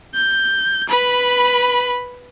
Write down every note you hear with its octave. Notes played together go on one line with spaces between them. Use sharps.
G6
B4 B5